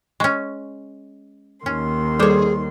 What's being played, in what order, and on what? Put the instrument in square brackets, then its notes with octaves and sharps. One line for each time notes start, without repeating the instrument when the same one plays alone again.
[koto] G#3 C#4 [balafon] C#6
[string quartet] D#2 D#3 C6 [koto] C#4
[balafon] G3 A4 D6 [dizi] G#4 [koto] C5 C#5